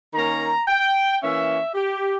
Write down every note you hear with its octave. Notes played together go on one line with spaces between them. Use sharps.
D#3 A#3 C#4 A#5
G5
E3 A#3 C#4 E5
G4